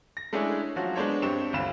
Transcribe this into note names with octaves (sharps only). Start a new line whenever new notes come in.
A#6
G#3 A3 C#4 D4 E4 G#4
F3 F#3 C#4 F#4
G#3 B3 D4 C5 C#5
G2 C4 G4 C#6 E7
G1 D2 F4 B5 E7